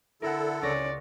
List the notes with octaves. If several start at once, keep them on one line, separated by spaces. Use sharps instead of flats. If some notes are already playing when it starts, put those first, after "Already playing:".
D3 E4 A4 A#4 E5 F#5
C#2 C#4 C#5 D5 A#6